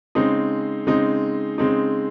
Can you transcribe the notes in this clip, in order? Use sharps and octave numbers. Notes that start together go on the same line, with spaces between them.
C#3 G#3 C4 D#4
C#3 G#3 C4 D#4
C#3 G#3 C4 D#4